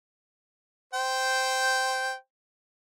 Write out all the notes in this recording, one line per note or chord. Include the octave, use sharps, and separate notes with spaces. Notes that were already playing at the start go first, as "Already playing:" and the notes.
C5 G5